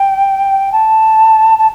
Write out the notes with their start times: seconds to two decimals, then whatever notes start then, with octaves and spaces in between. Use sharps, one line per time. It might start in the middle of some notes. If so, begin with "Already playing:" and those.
Already playing: G5
0.72 A5
1.58 A5